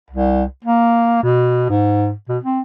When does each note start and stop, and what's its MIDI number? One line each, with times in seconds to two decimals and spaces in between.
0.11 0.43 36
0.64 1.21 58
1.23 1.68 47
1.69 2.12 44
2.29 2.38 47
2.43 2.61 60